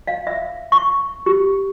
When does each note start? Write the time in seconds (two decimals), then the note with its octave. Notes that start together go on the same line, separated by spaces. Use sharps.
0.07 F5
0.27 E5
0.72 C#6
1.26 G4